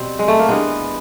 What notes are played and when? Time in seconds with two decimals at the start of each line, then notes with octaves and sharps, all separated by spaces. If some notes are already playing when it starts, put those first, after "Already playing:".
Already playing: B2 G3 C4
0.19 G#3
0.28 A3
0.40 A#3
0.49 G2 E3 G#3 B3